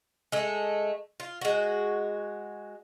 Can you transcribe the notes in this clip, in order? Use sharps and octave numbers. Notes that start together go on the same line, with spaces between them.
G#3 A3
F4
G#3 F#4